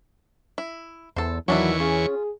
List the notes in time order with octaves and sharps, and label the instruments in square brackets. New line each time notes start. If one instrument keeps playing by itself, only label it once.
[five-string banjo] E4
[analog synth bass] E2 [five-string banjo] A4 C5
[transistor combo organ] E2 E3 C#6 [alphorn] D#3 [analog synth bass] F#3 [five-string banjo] C#4 D4 E4
[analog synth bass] C#4 [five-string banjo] F4 [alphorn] G#4